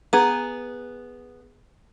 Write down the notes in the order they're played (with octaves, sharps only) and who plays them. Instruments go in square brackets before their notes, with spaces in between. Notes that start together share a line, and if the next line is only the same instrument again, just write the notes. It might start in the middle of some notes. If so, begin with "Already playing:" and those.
[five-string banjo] B3 G#4 [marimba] A#5